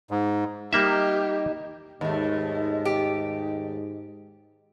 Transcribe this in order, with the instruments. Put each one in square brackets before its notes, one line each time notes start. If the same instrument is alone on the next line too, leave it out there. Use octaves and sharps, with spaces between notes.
[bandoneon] G#2
[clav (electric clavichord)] G3 A#3 E5 [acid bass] D#4 [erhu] G4
[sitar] D#2 A3 [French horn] G#2 [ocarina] D#5
[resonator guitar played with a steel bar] G4